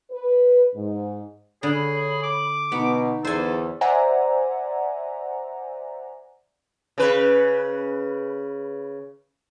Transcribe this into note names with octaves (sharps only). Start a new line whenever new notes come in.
B4
G#2
D3 G#4 C#5 B5
D6
B2 B3 D#4
E2 A4 C5 G#5
C5 D5 E5 F#5 G#5 A#5
C#3 B4